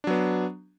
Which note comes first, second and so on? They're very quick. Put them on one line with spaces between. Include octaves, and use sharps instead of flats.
D4 F#3 B3